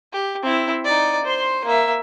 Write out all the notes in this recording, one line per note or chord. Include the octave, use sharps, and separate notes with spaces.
G4
C4 E4
D#4 D5
C5 C6
A#3 E5